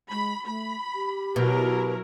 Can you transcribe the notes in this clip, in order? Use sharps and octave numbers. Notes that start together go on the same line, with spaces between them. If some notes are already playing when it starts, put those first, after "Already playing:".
G#3 B5
A3 B5
G4
B2 F#3 E4 A#4